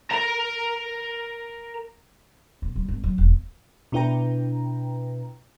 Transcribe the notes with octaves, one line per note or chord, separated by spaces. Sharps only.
A#4 A#5
B1
G3
G#1
F#3
E1
B2 D4 E4 B4 G5 A#5